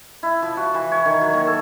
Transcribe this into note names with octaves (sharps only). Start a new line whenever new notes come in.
E4
F3
F#4
E3
C#5
D#3
F#3
A#3
A4